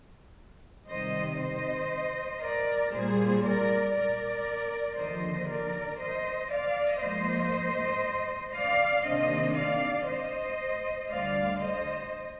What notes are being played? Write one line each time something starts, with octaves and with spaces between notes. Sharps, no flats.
C3 D#3 G3 C5 D#5
C5 D#5
A#4 D5
A#2 G3 A#3 G#4 C5
A#4 D5
A#4 D5
D#2 D3 F3 C5 D#5
A#4 D5
C5 D#5
D5 F5
G#2 F3 A#3 C5 D#5
D5 F5
C3 D#3 A#3 D4 C5 D#5
D5 F5
C5 D#5
D2 D3 G3 D5 F5
C5 D#5